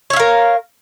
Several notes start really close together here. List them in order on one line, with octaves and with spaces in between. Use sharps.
C#5 E5 F5 A#4